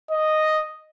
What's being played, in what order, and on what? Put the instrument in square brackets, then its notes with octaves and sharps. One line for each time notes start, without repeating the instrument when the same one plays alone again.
[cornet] D#5